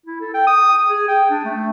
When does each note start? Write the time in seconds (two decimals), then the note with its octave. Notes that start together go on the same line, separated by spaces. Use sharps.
0.06 E4
0.21 A4
0.34 G5
0.47 D#6
0.90 G#4
1.08 G5
1.30 D4
1.45 A3